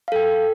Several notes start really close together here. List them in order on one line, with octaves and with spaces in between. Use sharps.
F5 A4 G5